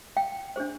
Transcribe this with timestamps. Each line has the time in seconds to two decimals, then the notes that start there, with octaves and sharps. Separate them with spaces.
0.17 G5
0.56 D4 G#4 C5